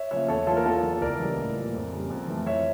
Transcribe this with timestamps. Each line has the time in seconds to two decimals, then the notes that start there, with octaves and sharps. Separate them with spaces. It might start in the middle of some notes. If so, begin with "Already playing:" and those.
Already playing: C#5 E5
0.11 C#3 F3 A#3 C#5 E5
0.28 E2 A4 C#5
0.47 E3 A#3 F4 A4
0.57 A#4
0.65 E2 F4 A4
0.83 E3 A#3
1.01 C#2 A#4 D5
1.19 C#3 E3 G3
1.37 A2
1.55 F3 A#3
1.74 F2
1.92 C#3 G3
2.10 F2
2.28 E3 A3
2.46 F2 C#5 E5